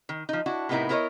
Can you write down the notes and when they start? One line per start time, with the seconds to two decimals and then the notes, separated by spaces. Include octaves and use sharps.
0.09 D#3
0.29 F3 D#4
0.46 D4 E4 F#4
0.69 A2 C3 B3 D#4 E4 A#4
0.89 B3 E4 A#4 C5 C#5 D#5